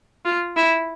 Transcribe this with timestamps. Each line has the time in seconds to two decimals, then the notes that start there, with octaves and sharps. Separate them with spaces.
0.25 F4
0.57 E4